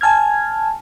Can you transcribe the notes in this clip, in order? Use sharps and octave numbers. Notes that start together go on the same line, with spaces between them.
G#5 A5 F6 G#6